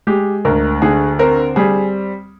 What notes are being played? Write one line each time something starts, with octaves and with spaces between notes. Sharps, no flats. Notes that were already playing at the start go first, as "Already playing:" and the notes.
G#3 G4
D2 A#4
D3 G#4
C4 A#4
G3 G#4